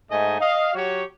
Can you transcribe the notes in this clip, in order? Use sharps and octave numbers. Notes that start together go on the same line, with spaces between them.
G#2 A3 D#4 D#5 G#5
D#5 F5
F#3 F#4 G4 C#5